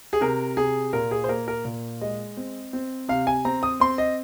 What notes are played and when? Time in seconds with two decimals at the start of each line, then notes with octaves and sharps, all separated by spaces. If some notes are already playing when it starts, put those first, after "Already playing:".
0.13 G#4
0.21 C3 A#4
0.57 C3 G#4
0.93 A#2 A#4
1.11 G#4
1.24 C5
1.29 A#3 A#4
1.48 A#4
1.65 A#2
2.01 G#3 D#5
2.37 C4
2.73 C4
3.09 C3 F5
3.27 G#5
3.45 C4 A#5
3.63 D#6
3.80 C4 C6
3.98 D#5